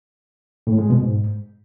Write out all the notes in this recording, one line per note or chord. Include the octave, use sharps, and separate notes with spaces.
A2
G#3
B2
G#2